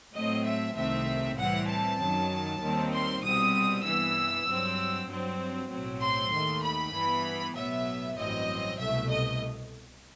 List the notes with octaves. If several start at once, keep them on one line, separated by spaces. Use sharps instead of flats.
A2 F#3 A3 C4 D#5
E5
C2 C3 D#3 A3 C4 E5
A2 E3 G3 C4 F#5
A5
F#2 D#3 F#3
D#2 D#3 G3 C4
C6
C2 B2 G3 C4 D#6
G2 E3 B3 E6
G2 F#3 C4
G2 F#3 C4
B1 A2 F#3 C4
C6
D#2 D#3 A3
B5
G2 E3 B3
B1 A2 F#3 B3 E5
A1 G2 F#3 C4 D#5
C2 B2 A3 E5
D#5